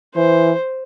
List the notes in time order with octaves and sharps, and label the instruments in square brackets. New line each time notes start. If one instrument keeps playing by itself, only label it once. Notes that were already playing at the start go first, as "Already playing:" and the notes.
[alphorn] E3 [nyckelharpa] C5